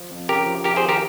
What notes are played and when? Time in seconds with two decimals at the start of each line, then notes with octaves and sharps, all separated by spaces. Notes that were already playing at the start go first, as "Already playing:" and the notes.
Already playing: F3
0.11 F2
0.28 C#3 G4 A#4
0.46 F3
0.64 F2 G4 A#4
0.76 G#4 C5
0.83 D#3
0.89 G4 A#4